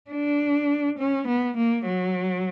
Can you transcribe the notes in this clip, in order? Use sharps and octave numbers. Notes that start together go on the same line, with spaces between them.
D4
C#4
B3
A#3
F#3